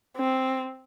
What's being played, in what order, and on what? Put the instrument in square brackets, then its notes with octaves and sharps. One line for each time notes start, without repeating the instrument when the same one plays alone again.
[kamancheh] C4